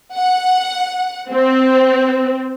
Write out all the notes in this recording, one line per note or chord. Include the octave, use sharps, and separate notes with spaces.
F#5
C4